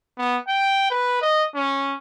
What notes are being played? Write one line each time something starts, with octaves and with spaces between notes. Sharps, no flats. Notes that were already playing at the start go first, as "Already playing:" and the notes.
B3
G5
B4
D#5
C#4